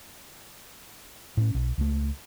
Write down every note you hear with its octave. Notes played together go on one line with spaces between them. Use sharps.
A2 C#4
B1
C#2 A3